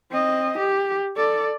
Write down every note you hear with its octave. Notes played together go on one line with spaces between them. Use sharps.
C4 D#5
G4
A4 D5